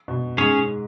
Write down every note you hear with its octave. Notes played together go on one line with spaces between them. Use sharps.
B2
G#2 C#4 G#4 C#5